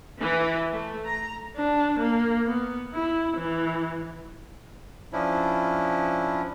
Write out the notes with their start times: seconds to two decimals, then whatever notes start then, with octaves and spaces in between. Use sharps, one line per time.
0.21 E3
0.72 A3
1.06 A#5
1.57 D4
2.00 A#3
2.46 B3
2.94 E4
3.37 E3
5.13 F3 C#4 D4 E4